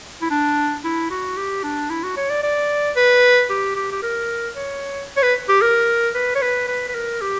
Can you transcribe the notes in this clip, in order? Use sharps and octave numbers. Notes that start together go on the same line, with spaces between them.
E4
D4
E4
F#4
G4
D4
E4
F#4
C#5
D5
D5
B4
G4
G4
G4
A#4
C#5
C#5
B4
G4
A#4
B4
C#5
B4
B4
B4
A#4
G4